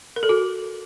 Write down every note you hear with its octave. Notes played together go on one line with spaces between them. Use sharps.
A#4
A4
F#4